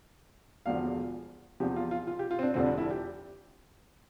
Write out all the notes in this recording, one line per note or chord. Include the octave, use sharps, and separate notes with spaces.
E1 E2 D3 F3 F5
E2 C3 F3 G4
F4
F4
F4
G4
F4
C4
D4
F1 F2 D3 F3 C4
D4
E4
G4